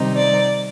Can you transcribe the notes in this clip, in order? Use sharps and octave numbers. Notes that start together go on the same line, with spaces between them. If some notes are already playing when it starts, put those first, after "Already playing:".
Already playing: C3 D#3 G3 C4 D#4
D5